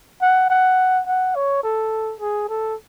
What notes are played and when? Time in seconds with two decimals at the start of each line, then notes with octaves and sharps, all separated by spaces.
0.22 F#5
0.50 F#5
1.07 F#5
1.36 C#5
1.63 A4
2.20 G#4
2.49 A4